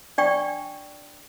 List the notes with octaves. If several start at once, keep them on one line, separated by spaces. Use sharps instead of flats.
D4 D5 G5 C#6